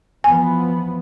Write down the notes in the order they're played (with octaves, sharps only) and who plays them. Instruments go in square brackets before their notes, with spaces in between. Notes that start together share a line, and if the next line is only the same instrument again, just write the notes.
[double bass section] E3 F3 B3 [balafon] G#5